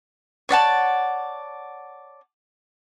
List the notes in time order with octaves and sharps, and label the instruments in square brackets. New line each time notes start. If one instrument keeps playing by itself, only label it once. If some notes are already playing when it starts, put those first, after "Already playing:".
[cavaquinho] C#5 D5 F#5 A5